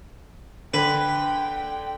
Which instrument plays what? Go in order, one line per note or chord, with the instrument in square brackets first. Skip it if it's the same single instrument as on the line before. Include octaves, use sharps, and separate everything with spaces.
[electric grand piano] D3 [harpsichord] B4 [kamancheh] G5